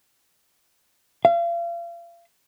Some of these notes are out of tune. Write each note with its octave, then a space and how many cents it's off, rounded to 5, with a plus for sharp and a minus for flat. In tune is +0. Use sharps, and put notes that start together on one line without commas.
F5 -35